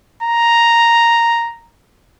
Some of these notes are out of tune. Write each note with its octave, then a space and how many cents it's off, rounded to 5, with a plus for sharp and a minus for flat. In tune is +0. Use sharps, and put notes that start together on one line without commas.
A#5 +0